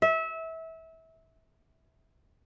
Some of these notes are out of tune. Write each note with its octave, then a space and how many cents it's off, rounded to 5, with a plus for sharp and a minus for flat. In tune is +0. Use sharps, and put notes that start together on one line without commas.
E5 -25